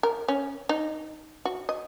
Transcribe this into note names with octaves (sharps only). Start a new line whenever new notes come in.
A#4
C#4
D#4
F#4
D#5